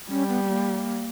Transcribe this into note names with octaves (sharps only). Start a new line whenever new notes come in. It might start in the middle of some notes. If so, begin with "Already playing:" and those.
G3 C#4
B3
B3
A#3